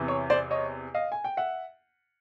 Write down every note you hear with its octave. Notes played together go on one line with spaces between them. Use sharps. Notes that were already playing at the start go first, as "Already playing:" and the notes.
Already playing: E2 C3 E3
C#5
C5 D5
C#5 D#5
D#5 F5
G#5
G5
E5 F#5